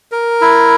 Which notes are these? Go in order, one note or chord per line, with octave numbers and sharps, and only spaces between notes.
A#4
E4